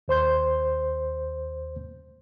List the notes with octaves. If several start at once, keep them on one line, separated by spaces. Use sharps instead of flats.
D#2 C5 C6 G6